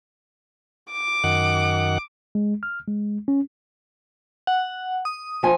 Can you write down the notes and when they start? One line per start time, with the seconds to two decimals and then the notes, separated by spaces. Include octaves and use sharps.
0.92 D6
1.24 F#2 D#3 F#5
2.35 G#3
2.63 F6
2.88 G#3
3.28 C#4
4.47 F#5
5.05 D#6
5.43 F3 G#5